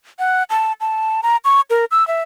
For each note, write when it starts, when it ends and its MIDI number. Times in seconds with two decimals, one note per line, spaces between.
0.19 0.43 78
0.50 0.73 81
0.81 1.21 81
1.23 1.37 82
1.45 1.61 85
1.70 1.85 70
1.91 2.06 88
2.08 2.23 76